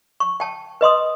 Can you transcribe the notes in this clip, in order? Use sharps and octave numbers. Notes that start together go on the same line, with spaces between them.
C#6
G5 A5
B4 D#5 C6 D#6